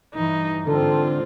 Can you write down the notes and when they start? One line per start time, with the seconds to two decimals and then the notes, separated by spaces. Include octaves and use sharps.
0.14 G2 E3 D#4
0.67 G#2 D3 C4 F4 A4